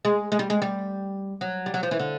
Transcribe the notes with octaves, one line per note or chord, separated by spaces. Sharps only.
G#3
G#3
G3
G#3
G3
F#3
G3
F#3
F3
E3
D3